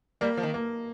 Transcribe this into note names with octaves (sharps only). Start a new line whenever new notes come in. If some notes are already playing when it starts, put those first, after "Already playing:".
G3 A#3
F3
D#3
A#3